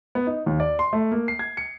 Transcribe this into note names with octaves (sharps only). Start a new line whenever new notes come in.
B3
D#4
D#2
D5
C6
A3
A#3
C7
G#6
C#7